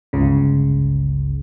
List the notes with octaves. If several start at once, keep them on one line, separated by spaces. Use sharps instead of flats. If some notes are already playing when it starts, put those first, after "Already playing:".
G1 C#2 C#3